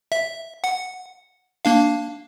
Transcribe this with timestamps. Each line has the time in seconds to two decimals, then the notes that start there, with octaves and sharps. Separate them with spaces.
0.12 E5
0.64 F#5
1.65 A#3 D4 F5